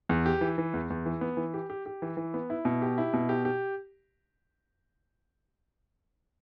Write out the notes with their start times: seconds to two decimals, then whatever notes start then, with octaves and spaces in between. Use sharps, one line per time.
0.09 E2
0.26 G4
0.41 E3
0.58 E3
0.74 E2
0.90 E2
1.06 E3
1.21 B3
1.37 E3
1.54 G4
1.70 G4
1.86 G4
2.02 E3
2.17 E3
2.34 B3
2.50 E4
2.65 B2
2.82 G4
2.98 E4
3.13 B2
3.29 G4
3.45 G4